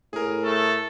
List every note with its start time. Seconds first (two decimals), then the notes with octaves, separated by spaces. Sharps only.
0.13 A2 G#4 A#4
0.44 A3 A4